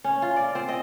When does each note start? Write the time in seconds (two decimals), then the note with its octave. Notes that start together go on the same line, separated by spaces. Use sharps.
0.04 C#4
0.22 F4
0.36 D5
0.55 C4
0.69 D#5